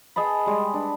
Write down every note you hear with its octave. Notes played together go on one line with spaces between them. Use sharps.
G#4 D#5 A5 B5
G3 G#3
D4